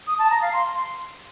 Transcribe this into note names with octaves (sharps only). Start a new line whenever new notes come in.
D#6
A5
A#5
F5
C6